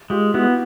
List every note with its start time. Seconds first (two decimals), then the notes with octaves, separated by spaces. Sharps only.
0.10 G#3 F4 G4
0.34 B3 E4 F#4